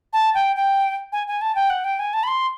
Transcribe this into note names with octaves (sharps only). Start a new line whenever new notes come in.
A5
G5
G5
G#5
G#5
A5
G5
F#5
G5
G#5
A5
B5
C6